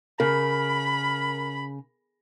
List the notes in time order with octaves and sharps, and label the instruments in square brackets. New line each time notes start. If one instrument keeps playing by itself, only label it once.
[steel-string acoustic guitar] C#3 [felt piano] A#4 [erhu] B5